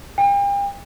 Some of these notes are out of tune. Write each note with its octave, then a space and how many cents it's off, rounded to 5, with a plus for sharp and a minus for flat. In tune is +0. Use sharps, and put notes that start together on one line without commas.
G5 +40